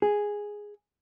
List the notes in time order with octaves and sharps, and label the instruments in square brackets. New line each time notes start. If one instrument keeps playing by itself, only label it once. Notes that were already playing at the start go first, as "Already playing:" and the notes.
[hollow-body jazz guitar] G#4